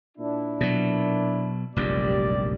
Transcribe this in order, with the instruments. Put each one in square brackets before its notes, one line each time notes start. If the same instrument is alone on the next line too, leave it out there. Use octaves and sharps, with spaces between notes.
[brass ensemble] A#2 D4 E4
[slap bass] B2 F#3
[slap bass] F1 A#1 F#2 [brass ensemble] G3 G4 D5